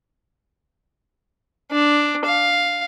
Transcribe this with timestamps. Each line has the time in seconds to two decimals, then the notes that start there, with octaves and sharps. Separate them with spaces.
1.71 D4
2.25 F5